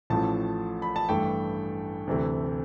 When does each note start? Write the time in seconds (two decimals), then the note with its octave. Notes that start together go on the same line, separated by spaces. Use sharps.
0.10 A1 A2 F3 A3 A5
0.82 B5
0.96 A5
1.09 G2 E3 A3 G5
2.07 D2 C3 E3 A3